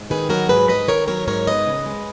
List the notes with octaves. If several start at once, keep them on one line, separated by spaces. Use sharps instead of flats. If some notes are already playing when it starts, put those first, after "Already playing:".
Already playing: G#2
D#3 G#4 B4
F#3 F#4 A#4
G#2 G#4 B4
G#2 B4 D#5
D#3 A#4 C#5
F#3 A#4 C#5
G#2 A#4 C#5
B3 B4 D#5
C#3
G#3